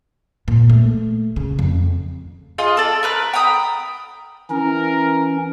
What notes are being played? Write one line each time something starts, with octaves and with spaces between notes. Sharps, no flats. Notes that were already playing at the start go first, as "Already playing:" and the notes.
A#2
A3
C#3
F2
F4 G#4 D#5
A4 D5
A#4 B4 F#6
G5 A#5 B5 D#6
E3 C#4 A#4